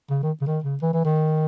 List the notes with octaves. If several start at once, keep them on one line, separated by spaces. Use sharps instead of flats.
C#3
D#3
C#3
D#3
C#3
E3
E3
D#3